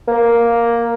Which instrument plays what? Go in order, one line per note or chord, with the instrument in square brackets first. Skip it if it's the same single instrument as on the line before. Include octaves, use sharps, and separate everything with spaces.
[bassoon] A#3